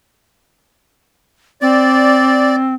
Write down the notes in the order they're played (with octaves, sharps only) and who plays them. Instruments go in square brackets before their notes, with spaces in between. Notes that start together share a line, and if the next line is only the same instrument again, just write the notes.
[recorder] C4 [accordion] D5